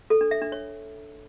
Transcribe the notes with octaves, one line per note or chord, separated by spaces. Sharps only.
A4
D4
E5
D4
C#5